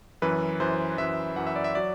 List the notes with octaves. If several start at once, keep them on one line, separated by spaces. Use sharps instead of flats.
F#2 E3 B4
F#2 E3 C5
F#2 E3 E5
F#2 E3 F#5
E5
D5
E5
F#3 D5